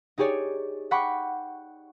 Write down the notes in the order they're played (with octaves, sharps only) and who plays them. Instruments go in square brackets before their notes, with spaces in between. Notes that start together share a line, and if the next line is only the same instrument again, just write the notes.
[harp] D#4 G4 G#4 C#5 D5
F#5 G5 B5 C#6 D6